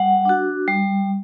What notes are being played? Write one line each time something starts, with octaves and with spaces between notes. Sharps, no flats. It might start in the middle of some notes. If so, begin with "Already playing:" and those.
Already playing: G3 F#5
D4 F#4
G3